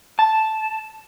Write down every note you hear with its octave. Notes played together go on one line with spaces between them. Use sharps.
A5